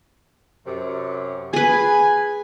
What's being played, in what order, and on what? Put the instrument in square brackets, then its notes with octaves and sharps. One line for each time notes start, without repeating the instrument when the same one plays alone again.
[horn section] F#2 C3
[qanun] G#4 B4 [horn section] G#5